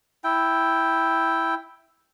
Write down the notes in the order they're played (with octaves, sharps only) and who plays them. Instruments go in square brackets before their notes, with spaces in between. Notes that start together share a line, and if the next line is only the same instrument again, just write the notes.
[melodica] E4 G5